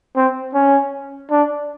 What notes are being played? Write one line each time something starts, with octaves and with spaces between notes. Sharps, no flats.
C4
C#4
D4